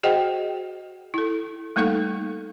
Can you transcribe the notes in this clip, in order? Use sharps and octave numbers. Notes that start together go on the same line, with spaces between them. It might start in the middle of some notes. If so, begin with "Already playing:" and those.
F#4 G#4 C5 D#5 F#5 G5
E4 A4
G3 A3 A#3 D#4 A4 F5